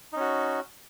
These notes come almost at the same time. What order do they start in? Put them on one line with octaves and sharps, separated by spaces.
D#4 C#4 F#4